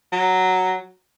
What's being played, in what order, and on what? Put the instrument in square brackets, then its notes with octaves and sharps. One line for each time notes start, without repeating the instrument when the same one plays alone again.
[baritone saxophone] F#3